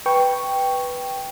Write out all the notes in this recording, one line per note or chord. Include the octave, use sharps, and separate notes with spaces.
B4 G5 C#6